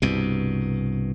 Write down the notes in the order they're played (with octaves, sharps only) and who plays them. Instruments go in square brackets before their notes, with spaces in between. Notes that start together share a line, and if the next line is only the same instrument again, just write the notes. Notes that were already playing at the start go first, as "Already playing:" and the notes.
[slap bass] C2 G2 B2